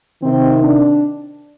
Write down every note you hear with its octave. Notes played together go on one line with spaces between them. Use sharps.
C3 D#3 C4
D4